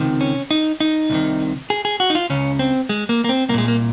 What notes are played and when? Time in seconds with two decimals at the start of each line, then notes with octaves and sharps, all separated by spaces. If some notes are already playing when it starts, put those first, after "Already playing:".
Already playing: C#2 C3 D#3
0.21 C#4
0.51 D#4
0.80 D#4
1.10 C2 C3 D#3
1.70 G#4
1.85 G#4
2.00 F#4
2.10 D#4
2.15 F4
2.30 C#2 C#3 C#4
2.59 C4
2.89 G#3
3.09 A#3
3.24 A#3
3.29 C4
3.49 C2 A#3
3.54 A#2 G#3
3.68 A#3